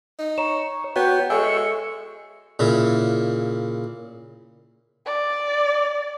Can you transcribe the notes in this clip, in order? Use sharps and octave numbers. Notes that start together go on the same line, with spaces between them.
D#4
C#5 A#5 E7
B3 F#4 C#5 G5
G#3 A4 E5 G#5 C#6
A#2 C#3 E4
D5